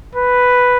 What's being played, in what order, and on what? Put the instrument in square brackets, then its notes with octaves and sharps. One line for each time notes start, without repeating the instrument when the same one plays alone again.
[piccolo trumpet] B4